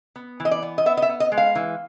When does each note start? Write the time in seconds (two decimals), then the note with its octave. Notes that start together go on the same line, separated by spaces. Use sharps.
0.16 B3
0.40 E3
0.45 D#5
0.51 D5
0.62 B3
0.78 D#5
0.86 B3 E5
0.97 D#5
1.02 E5
1.09 B3
1.20 D#5
1.32 G#3
1.38 F5
1.55 E3